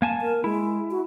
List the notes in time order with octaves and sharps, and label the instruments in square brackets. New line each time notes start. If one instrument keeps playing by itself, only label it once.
[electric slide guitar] A#3 G#5 A5
[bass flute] A#4
[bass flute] G#3 [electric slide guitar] E4
[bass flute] F#4